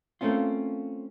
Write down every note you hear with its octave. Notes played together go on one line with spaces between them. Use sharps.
A3 A#3 C4 C#4 F4